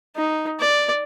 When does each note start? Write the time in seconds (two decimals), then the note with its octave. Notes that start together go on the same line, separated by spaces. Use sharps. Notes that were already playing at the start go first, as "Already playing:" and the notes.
0.17 D#4
0.60 D5